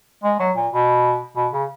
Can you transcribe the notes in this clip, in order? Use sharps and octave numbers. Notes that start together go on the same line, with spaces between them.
G#3
F#3
A#2
B2
B2
C#3